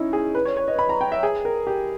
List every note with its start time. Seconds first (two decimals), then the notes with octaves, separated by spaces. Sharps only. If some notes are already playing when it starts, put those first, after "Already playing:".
Already playing: C#4 D#4 E4
0.13 G#4
0.35 B4
0.45 C#5
0.57 C#5
0.68 D#5
0.79 B5
0.89 A#5
1.01 G5
1.12 E5
1.23 G#4
1.45 A#4
1.67 G4